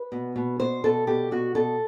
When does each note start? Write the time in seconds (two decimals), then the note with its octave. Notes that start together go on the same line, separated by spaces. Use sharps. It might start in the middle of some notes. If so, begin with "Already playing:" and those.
Already playing: B4
0.12 B2
0.36 B2
0.59 B2 C5
0.84 B2 A4
1.07 B2 G4
1.31 B2 F#4
1.55 B2 A4